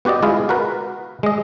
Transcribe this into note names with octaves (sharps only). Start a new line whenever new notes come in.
B3 F#4 G4 D5 D#5
G#3 E4 F4 G#4
F#4 A#4 B4
G#3 D#5